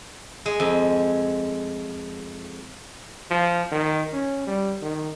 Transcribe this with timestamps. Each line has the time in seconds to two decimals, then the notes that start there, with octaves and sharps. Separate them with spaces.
0.46 G#3
0.60 F2
3.31 F3
3.72 D#3
4.13 C#4
4.47 G3
4.82 D#3